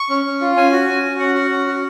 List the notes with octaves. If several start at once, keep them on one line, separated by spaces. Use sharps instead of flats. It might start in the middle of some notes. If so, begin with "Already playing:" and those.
Already playing: C#6
C#4
C#4
F4
C#4 G#5
F#4
C#4
F#4
C#4 F#5
F#4
C#4
F#4